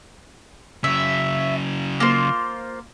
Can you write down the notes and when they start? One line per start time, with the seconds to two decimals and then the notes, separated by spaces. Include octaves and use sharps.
0.84 C#3 F#3 E5
2.00 A#3 F4 C5